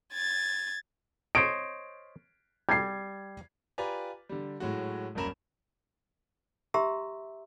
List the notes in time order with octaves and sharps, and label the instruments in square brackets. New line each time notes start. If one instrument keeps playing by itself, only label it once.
[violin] G#6 A6
[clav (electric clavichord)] C5 C#5 D#5 [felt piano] D7
[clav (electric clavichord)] G3 [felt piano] G#6 C7
[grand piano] F4 G4 B4 D5 G#5 A#5
D3 G3
A2 F#3 G#3 F#4
D#1 A#1 F#2 A#4 B5 E7
[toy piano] G4 E5 A#5 C6 E6